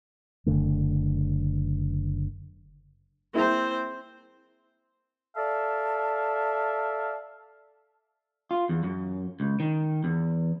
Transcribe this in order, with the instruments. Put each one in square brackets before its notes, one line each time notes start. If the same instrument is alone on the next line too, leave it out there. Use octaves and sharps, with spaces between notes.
[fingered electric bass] F#1 E2 D3 A3
[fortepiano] A#3 E4 G#4 [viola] C4 C5
[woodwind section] A4 D5 E5 F5 A5
[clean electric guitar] F4
E2
F#2
C#2
D#3
E2